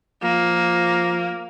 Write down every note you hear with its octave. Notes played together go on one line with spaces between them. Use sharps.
F3 A#3